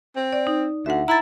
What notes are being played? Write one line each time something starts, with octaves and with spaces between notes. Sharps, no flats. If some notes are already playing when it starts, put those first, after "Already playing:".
C4
D5
D#4
D2 E5 F#5
E4 A#5 A6